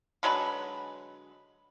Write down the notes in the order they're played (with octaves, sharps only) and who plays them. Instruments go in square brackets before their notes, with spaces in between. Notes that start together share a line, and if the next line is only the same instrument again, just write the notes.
[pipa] D3 F#3 G#3 B4